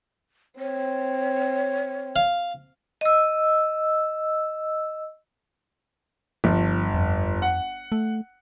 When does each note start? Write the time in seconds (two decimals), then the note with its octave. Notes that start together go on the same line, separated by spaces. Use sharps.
0.59 C4 C#5
2.16 F5
3.01 D#5 E6
6.44 G1 F3
6.95 F2
7.42 F#5
7.92 A3